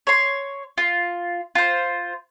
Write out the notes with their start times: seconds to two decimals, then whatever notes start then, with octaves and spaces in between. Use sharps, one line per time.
0.07 C#5 C6
0.78 F4
1.55 F4 C5